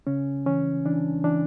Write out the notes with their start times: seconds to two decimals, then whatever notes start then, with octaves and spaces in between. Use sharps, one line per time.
0.07 C#3 C#4
0.46 E3 C#4
0.85 E3 D4
1.24 E3 D4